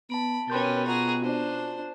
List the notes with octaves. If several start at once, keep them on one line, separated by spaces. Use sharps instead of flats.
B3 A5 B5 D7
B2 C#4 G4 A#4 B4 C6 G6 A6
F4 F#4 G#4 A#5
D4 C5